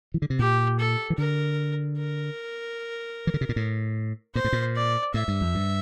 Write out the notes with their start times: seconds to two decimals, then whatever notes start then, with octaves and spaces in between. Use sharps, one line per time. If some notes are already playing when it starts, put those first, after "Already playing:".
0.14 E3
0.22 D3
0.30 C3
0.39 A#2 G4
0.79 A4
1.10 E3
1.18 D3 A#4
1.98 A#4
3.27 E3
3.34 D3
3.41 C3
3.49 A#2
3.56 A2
4.35 A#2 C5
4.44 A2
4.53 A#2
4.75 D5
5.14 A2 E5
5.28 G2
5.41 F2
5.55 G2